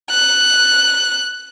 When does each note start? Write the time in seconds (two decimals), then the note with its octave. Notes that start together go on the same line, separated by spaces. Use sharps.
0.10 F#6